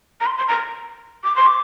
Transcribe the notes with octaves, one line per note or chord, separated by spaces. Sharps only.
A#5
C6
C6
A#5
D6
C6
D6